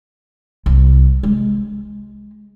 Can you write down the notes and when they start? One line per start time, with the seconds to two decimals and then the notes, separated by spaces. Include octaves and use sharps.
0.66 C2
1.23 G#3